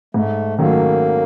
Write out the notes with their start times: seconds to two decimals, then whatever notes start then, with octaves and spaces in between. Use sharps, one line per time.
0.14 G#2 A3
0.59 D#3 F#3 A3 A#3 C#4